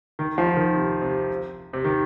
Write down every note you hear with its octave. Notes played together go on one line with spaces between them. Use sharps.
D#3
F3
D#3
C3
C3
C3
D#3